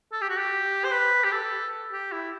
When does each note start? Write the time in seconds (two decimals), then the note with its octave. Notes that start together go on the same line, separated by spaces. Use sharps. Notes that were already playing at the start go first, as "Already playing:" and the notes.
0.12 A4
0.21 G4
0.29 F#4
0.39 G4
0.84 C5
0.92 B4
1.24 G4
1.32 A4
1.92 G4
2.12 E4